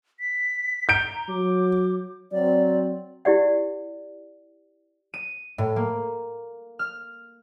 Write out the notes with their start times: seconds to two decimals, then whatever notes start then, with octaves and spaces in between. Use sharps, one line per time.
0.20 B6
0.89 A#5 G6 D7
1.29 F#3 D6
2.32 F#3 C4 D5
3.25 E4 G4 D5 F#5
5.14 D#7
5.58 A2
5.76 A#3
6.79 F6